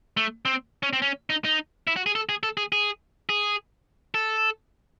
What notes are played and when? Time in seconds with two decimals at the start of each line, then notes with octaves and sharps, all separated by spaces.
0.17 A3
0.45 C4
0.83 C#4
0.93 C4
1.02 C#4
1.30 D#4
1.45 D#4
1.87 E4
1.96 F#4
2.06 G#4
2.15 A4
2.29 G#4
2.43 A4
2.57 G#4
2.72 G#4
3.29 G#4
4.14 A4